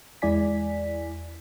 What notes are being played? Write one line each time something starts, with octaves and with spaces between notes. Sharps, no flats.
E2 G#3 E4 D5 G#5 B6